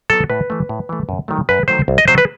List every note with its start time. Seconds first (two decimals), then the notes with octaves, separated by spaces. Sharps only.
0.10 F#3 B3 A4
0.30 A2 B4
0.50 E3 A3
0.69 A2
0.89 E3 A3
1.09 F#2
1.28 D#3 F#3 A3
1.49 F#2 B4
1.68 D#3 F#3 A3 C5
1.88 C2
1.98 D#5
2.08 C3 F#3 C5
2.18 B4